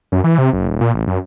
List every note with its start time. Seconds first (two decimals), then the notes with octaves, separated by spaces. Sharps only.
0.12 F#2
0.24 E3
0.38 C3
0.53 F#1
0.68 D#1
0.81 A#2
0.95 A1
1.07 F#2